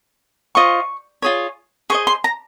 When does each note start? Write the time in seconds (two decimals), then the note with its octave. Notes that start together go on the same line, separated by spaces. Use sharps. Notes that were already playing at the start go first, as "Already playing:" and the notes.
0.55 F4 C5 D#5 C#6
1.22 F4 G#4 C#5
1.90 G#4 C5 D#5 C#6
2.07 C6
2.24 A#5